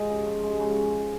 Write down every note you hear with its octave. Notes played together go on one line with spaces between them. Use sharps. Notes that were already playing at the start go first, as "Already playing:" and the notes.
Already playing: F3 G#3 D#5
C#3
F3
G#3
C#3